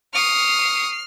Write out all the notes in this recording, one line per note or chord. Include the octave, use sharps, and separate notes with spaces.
C#6 D#6 F6 C7